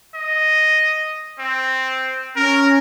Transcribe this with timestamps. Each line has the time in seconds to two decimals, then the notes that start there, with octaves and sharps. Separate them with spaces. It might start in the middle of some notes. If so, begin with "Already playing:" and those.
0.15 D#5
1.39 C4
2.36 C#4 A#4